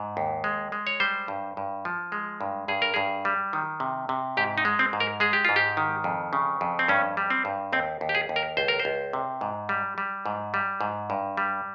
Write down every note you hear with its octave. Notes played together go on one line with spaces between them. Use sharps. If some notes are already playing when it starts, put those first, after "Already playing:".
Already playing: G#2
D#2
G#3
G#3
C#5
G3 C5
G2
G2
F3
G#3
G2
G2 G#4
A#4
G2 G#4
G3
D#3
C3
C3
G#2 G4
D#4
G#3
C4
G#2
A#4
G#3 G#4
G4
G#2 F4
G4
D#3
F2
C#3
F2
C4
G2 C#4
G3
C4
G2
D#2 C4
D#2
G4
G#4
D#2
A#4
C#2 C5
A#4
C5
C#2
C3
G#2
G3
G3
G#2
G3
G#2
G2
G3